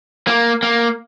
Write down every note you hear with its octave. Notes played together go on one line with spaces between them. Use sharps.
A#3
A#3